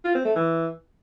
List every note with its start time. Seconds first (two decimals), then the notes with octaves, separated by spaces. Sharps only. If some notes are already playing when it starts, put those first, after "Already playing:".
0.05 F4
0.15 C4
0.25 A3
0.35 E3